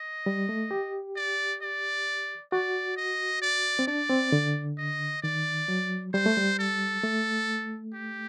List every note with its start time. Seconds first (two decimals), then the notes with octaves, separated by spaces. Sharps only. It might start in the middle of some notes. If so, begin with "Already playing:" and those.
Already playing: D#5
0.26 G3
0.49 A3
0.71 G4
1.16 D5
1.62 D5
2.52 F#4 D5
2.97 D#5
3.42 D5
3.79 C4
3.87 D4 D5
4.09 C4
4.32 D3
4.78 D#5
5.23 D#3 D5
5.68 F#3
6.13 G3 C5
6.26 A3
6.37 G3
6.59 A4
7.04 A3
7.94 G4